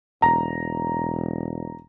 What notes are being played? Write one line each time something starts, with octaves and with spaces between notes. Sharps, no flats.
E1 A#5